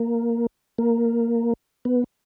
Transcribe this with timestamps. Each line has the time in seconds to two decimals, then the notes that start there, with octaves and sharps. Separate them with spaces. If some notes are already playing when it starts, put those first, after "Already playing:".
Already playing: A#3
0.78 A#3
1.85 B3